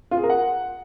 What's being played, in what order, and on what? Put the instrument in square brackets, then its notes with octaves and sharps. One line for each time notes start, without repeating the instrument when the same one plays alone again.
[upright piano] F4
G#4
A#4
F#5